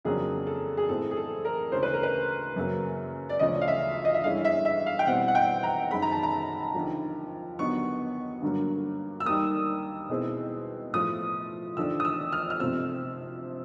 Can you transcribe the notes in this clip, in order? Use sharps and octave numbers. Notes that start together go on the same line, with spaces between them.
F2 C#3 F#3 A#3 D4 G#4
A4
G#4
A2 E3 G#3 C4 A4
G#4
A4
A#4
D2 C#3 E3 G#3 C#4 C5
B4
A#4
B4
F#2 C#3 F#3 A#3
D5
D2 C#3 F3 A3 C#4 D#5
F5
E5
D#5
E5
G2 E3 G#3 C#4 E4 F5
E5
E5
F5
G5
B2 G3 C4 E4 F#5
F#5
G5
A#5
F#2 D#3 G#3 B5
A#5
A5
A#5
D#2 D3 F3
D#2 D3 F#3 B3 D#4 C#6
G2 D3 F#3 A#3
E6
D#2 D#3 G3 A#3 D#6
B2 G#3 C4 E4
A2 F3 A3 D#6
D#2 D3 F3 A3 D4 E6
D#6
E6
F6
F6
C3 F3 A3 C4 E6